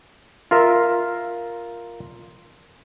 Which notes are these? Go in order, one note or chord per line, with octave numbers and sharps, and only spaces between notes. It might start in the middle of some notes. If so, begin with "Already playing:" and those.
F4 A#4 E5